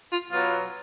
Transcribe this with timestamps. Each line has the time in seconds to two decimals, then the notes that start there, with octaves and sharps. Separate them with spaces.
0.09 F4
0.30 B2 F#3 B3 F4